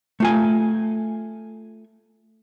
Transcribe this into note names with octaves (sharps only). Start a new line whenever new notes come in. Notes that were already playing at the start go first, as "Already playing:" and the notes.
A3 F4 G#5